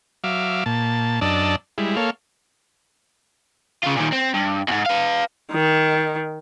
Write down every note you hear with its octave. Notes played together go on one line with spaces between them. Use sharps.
F#3 E5 F5 D6
A#2 A5
F#2 D4 D5 D#5 A5 E6
G3 G#3 E4
A#3 A4 C#5 F5
C#3 F4
A#2 D#3
C4
G2
E2 G#2
B4 F5
D#3